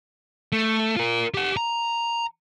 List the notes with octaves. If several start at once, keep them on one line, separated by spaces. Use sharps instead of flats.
A3
F4 A#4
G4 F#5
A#5